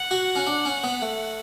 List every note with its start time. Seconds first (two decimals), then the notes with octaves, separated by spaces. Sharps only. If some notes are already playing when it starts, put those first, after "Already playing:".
Already playing: F#5
0.11 F#4
0.35 C#4
0.47 D4
0.65 C#4
0.84 B3
1.02 A3